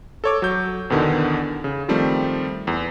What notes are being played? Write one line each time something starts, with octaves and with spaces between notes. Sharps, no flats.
A4 C#5 D6
F#3 G6
E2 B2 D3 D#3
C#3
D#3 F3 G3 A3 C4
E2